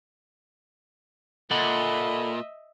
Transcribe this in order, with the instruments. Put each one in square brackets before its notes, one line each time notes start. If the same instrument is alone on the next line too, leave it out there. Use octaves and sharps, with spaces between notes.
[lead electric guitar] A#2 [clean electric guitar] A4 F#5 [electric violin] D#5 E5 [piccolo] B5